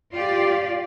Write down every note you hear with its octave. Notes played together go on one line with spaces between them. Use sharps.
F4 G4 D5